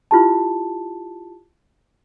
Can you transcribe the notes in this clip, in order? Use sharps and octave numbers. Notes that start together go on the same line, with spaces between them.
E4 F4 G4 A5